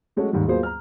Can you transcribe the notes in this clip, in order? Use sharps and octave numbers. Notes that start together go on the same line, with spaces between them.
F#3 G#3 A3 C#4 F#4
D#2 G#2 D#3 G3
F#3 A#3 B3 F4 G#4 C5
A#5 F6